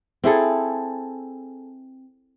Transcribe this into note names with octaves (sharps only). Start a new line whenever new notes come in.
C4 E4 G#4 A4